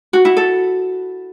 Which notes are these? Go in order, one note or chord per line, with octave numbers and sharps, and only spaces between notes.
F#4
E4
A4